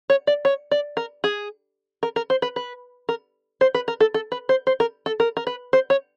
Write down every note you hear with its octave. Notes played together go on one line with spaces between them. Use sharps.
C#5
D5
C#5
D5
A#4
G#4
A#4
A#4
C5
B4
B4
A#4
C5
B4
A#4
A4
A4
B4
C5
C5
A#4
A4
A#4
A#4
B4
C5
C#5